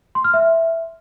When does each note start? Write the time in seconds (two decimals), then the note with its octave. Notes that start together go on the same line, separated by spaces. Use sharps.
0.15 C6
0.24 F6
0.34 E5